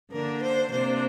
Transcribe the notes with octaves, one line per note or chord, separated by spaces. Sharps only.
D3 A#3 D4 A#4
C5
C3 A#3 D4 C5